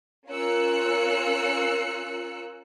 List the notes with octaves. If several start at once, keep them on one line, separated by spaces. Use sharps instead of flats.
C#4 F4 A#4 E6 F#6 C#7